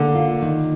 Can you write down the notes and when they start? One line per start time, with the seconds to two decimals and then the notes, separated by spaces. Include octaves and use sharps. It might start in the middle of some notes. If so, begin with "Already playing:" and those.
Already playing: D3 A#3
0.15 F4
0.42 D#3